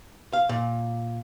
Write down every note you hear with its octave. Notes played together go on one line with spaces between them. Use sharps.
F5
A#2